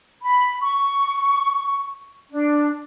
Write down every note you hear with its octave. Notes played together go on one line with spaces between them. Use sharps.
B5
C#6
D4